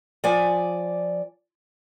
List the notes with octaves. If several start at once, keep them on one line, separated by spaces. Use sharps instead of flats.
F3 D5 G#5